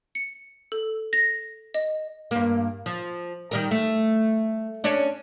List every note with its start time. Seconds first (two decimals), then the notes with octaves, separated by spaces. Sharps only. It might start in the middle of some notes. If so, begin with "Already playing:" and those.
0.15 C#7
0.72 A4
1.13 A#6
1.74 D#5
2.31 G2 A#3
2.86 F3
3.51 D#3 G3 A#4
3.71 A3
4.84 C#4 D4 C#5